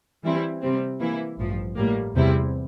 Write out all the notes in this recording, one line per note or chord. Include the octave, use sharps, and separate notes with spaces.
E3 G3 C4 E4
C3 G3 C4
E3 A#3 E4
A1 G2 F3
A2 G3 A#3
E2 C3 G3 C4 E4